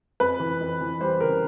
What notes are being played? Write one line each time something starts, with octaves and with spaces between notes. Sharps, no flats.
F2 B4
E3
F2
E3
G3 C5
C#3 A#4